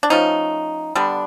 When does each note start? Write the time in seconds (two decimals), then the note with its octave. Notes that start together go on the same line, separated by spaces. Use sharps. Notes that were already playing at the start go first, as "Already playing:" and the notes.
0.03 D4
0.10 F3 A3 C#4 D#4
0.95 D3 G3 B3 D4